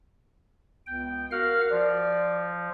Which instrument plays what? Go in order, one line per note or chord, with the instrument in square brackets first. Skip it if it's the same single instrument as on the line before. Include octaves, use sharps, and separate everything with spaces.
[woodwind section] C#2 B3 [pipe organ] G5
[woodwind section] F#4 A#4 [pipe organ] F5 F#5 F6
[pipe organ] F3 [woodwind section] D5